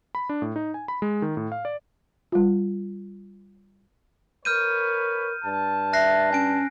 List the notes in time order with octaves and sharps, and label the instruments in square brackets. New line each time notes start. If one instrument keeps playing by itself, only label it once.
[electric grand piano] B5
D4
A2
D#4
G#5
B5
G#3
D#3
A2
F5
D5
[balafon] G3 F4
[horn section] A#4 B4 C#5 [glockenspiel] F6 G6 D#7
[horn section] G2 A5
[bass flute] E5 [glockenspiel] F#6 A#6 C7
[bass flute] C#4 [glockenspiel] G#5 D7